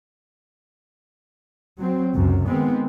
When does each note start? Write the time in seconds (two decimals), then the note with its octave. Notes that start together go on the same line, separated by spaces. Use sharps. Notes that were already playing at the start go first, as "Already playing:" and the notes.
1.79 F#3 C4
2.14 C#2 F#2 C3
2.47 D#3 G#3 B3 C4